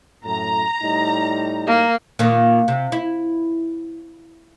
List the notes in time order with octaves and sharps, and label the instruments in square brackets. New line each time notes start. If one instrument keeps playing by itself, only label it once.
[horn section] F#2 A2 [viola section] A#5
[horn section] A2 G3 D#4
[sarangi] A#3
[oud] A#2 D#3
C3
E4